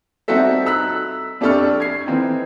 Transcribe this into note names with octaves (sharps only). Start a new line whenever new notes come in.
G3 C4 D#4 F#4 A4 E5
A#5 E6 F#6 B6
F2 D4 G4 A4 C#6 F6
G#6 C7
E3 C4 D#4